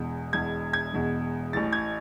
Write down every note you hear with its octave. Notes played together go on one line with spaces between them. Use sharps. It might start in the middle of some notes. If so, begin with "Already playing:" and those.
Already playing: E1 E2 B2
E1 E2 B2 G#6
G#6
E1 E2 B2
A1 A2 E3 A6
G#6